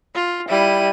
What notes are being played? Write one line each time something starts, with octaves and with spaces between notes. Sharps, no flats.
F4
G3 E4 D#7